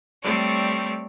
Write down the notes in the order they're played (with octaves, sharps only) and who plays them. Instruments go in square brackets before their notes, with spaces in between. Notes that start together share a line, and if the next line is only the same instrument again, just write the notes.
[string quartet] G3 A3 C4 C#5 D5